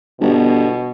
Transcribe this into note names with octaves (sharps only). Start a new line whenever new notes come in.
G1 B2